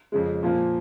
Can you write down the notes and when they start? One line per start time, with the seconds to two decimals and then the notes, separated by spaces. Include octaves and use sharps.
0.12 F2 C#3 G#3
0.43 A#2 F3 A#3